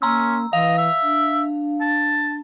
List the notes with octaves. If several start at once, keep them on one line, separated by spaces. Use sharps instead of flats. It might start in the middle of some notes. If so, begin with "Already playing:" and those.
A#3 C#4 A#5 C6 E6
E3 D#5 F5
E5
D4
A5